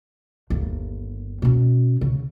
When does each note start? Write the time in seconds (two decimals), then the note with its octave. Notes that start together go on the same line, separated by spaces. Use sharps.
0.50 G1 D#2
1.42 B2 C#4
2.01 C#3